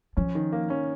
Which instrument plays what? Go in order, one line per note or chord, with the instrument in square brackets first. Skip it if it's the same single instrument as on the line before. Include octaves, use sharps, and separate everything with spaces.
[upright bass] F3 [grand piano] C#4
[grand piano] D#3
A#3
C#4